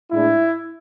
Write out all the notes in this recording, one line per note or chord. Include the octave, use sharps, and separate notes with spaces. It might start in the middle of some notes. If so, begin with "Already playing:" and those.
A2 G#3 D4 E4